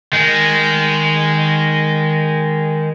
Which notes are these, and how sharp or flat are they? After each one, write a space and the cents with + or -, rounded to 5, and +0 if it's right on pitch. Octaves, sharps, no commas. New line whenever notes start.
D#3 +0 G#3 -10